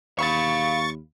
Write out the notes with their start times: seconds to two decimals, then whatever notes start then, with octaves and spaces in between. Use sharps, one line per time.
0.19 D#2 F5 B5 C#6 A6